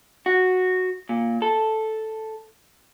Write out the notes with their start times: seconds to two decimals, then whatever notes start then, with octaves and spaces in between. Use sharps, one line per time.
0.26 F#4
1.09 A#2
1.42 A4